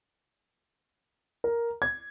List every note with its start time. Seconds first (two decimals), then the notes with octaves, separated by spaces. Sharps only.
1.44 A#4
1.82 G#6